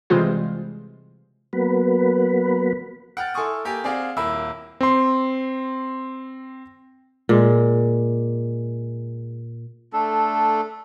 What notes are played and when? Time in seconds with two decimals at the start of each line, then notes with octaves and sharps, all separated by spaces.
0.10 C3 E3 G3 G#3 F4 C5
1.53 F#3 A#3 B3 B4
3.17 F#5 G5 F6 A6
3.34 E4 A4 G#5 C6 C#6 D#6
3.65 A#3 G4 A4 G#5
3.84 C4 G#4 D5 F5 F#5
4.17 D#1 A#3 E4 B5 E6
4.81 C4 C6
7.29 A#2 G#3
9.93 A3 D4 A4